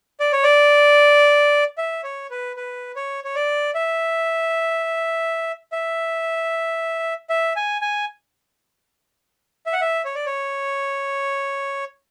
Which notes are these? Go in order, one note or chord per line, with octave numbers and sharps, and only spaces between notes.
D5
C#5
D5
E5
C#5
B4
B4
C#5
C#5
D5
E5
E5
E5
G#5
G#5
E5
F#5
E5
C#5
D5
C#5